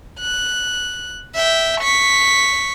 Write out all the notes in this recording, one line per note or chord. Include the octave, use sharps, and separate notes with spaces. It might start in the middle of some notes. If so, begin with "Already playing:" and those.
F#6
E5 G5
C#6 B6